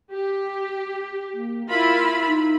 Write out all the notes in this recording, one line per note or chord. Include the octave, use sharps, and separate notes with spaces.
G4
A#3
E4 F4 A#4 B5
D#4